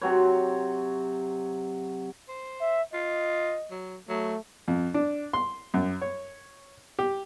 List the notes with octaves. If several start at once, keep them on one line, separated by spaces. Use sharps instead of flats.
C3 F#3 C#5
C5
E5
F4 D#5
F#3
F#3 A3
F2
D4
C6
F#2
C#5
G4